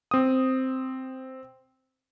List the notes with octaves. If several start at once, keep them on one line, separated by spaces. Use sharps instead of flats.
C4 D#6